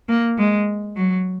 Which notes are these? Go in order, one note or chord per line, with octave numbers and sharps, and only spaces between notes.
A#3
G#3
F#3